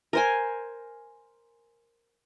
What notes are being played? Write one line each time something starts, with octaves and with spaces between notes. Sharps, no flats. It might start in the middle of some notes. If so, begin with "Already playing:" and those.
A#4 C5 G#5